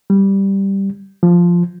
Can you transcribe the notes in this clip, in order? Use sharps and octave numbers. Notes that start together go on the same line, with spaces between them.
G3
F3